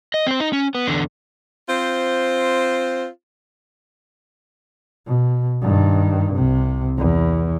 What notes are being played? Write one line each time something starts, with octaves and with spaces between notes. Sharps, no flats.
D#5
C4 C5
D#4
C#4
B3
E2 D3
C4 F4 C5
B2
G2 D#3
C2 C3
E2